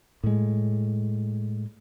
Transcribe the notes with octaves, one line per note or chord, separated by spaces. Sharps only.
A2 G#3